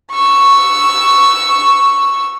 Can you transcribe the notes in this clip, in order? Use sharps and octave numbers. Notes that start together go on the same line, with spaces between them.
C#6 E6